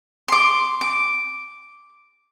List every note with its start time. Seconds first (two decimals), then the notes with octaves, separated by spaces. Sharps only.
0.28 C6 D6
0.81 D6